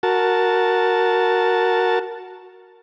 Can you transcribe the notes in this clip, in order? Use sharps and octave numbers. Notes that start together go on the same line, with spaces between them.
F#4 A#4 A5